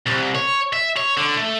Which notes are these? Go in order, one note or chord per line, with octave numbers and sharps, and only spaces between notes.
C2
C#5
E5
C#5
D3
A3